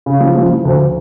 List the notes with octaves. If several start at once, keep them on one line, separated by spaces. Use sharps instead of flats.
C#3
F3
F3
F3
D2